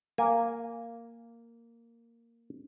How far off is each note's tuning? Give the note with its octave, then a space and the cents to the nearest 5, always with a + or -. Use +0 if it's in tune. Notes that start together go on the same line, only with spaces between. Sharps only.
A#3 -10 G#5 -10